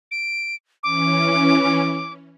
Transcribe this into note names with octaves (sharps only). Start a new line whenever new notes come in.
D7
E3 C#4 D6